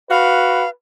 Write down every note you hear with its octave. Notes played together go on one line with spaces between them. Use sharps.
F#4 B4 F5